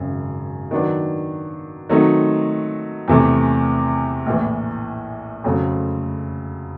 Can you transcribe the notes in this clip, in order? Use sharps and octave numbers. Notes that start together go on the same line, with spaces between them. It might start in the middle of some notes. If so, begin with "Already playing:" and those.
Already playing: G#1 F#2 C#3
D#3 F#3 B3 D4
D#3 F#3 A3 C4 D#4
E2 C3 E3 A3
A#1 A2 E3
F2 C#3 F#3 A3 C4